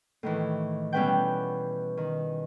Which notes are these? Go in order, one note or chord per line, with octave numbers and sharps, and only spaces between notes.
A2 D#3 E3
B2 G3 C#4 B4 F#5 G5
D#3